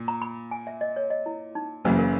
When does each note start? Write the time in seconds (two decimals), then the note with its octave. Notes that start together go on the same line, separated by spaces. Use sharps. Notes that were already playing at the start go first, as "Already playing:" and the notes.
Already playing: A#2
0.08 A#5
0.22 B5
0.51 G#5
0.67 E5
0.81 D#5
0.96 C#5
1.10 D#5
1.26 E4
1.55 D#4
1.85 F#1 F#2 C#3 E3 A#3 B4
1.99 A#4